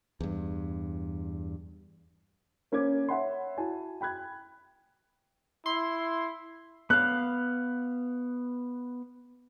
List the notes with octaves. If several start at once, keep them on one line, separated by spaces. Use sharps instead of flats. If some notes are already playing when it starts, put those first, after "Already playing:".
E2 G2
A#3 C#4 C5 D6 G#6
C#5 E5 F#5 G#5 B5 C6
E4 F#4 G#5 A5
G5 B5 F#6 G#6
E4 C6
B3 F5 F#6